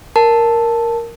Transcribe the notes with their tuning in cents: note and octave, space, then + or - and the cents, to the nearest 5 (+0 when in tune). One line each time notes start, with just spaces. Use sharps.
A#4 +0 A5 +0